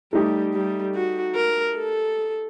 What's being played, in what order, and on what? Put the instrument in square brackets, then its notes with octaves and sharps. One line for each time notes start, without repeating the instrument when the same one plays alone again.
[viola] G3 [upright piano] A3 D#4 G4
[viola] G3
F#4
A#4
A4